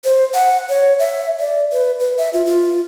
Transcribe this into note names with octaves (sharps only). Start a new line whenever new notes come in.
C5
F#5
C#5
E5
D5
B4
B4
E5
F4
F4